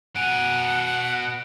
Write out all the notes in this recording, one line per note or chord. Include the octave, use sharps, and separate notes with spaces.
B2 F#5 G#5 D7 F7